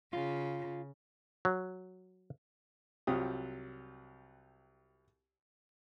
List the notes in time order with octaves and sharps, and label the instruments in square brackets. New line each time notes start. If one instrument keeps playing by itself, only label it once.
[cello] C#3 [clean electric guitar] F4
[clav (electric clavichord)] F#3
[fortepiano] C2 F#3 C4 F4 G4 D#6